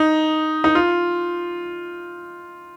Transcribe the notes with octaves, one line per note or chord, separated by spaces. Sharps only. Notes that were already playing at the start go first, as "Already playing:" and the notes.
Already playing: D#4
D#4
F4